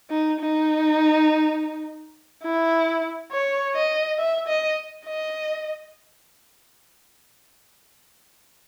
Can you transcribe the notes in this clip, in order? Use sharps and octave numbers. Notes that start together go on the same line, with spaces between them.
D#4
D#4
E4
C#5
D#5
E5
D#5
D#5